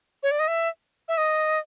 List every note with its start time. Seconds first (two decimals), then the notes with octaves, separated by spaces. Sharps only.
0.23 C#5
0.31 D5
0.40 D#5
0.48 E5
1.08 E5
1.18 D#5